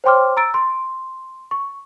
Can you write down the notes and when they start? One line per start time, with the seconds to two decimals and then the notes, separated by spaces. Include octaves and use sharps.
0.04 C5 C#5 G5 C6 D6 F6
0.37 A#5 E6 A6 D7
0.54 C6
1.51 C#6